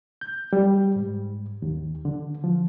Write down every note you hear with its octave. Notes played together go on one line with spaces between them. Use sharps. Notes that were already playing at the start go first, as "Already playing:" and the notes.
G6
G3
G#2
D#2
D3
F3